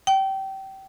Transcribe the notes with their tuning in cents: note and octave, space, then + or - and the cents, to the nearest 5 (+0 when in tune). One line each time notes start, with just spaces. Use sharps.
G5 -25